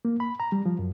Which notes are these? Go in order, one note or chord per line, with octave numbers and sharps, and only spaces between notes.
A#3
B5
A#5
G3
F3
F#2